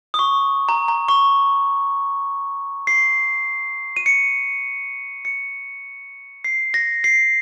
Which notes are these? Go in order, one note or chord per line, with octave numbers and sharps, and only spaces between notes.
D#6
C#6
A#5
A#5
C#6
C7
D#7
C#7
C#7
C7
A#6
C7